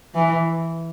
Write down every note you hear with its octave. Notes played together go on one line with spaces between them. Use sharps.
E3